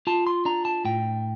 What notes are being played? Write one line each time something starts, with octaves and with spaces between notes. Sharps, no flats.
F4 A5
C6
D4 A#5
A5
A2 G5